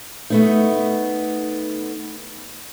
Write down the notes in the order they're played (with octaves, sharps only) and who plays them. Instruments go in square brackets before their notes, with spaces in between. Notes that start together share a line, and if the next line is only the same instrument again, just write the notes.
[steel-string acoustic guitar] A3 B3 D#4